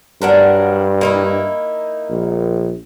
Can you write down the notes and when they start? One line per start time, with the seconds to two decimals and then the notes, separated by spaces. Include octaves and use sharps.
0.22 G2 F#3 D4 A#4
1.01 A#3 D#4 E4
2.10 A#1